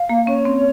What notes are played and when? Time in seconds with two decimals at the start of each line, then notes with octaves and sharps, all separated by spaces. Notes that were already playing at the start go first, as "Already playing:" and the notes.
Already playing: F5
0.09 A#3
0.27 C#4 C#5
0.45 C4